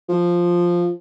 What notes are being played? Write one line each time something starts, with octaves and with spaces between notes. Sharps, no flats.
F3